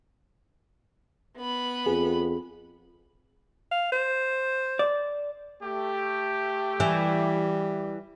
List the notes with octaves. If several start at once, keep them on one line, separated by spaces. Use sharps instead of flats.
B3 B5
F2 G#4
F5
C5
D5
A3 G4
E3 G3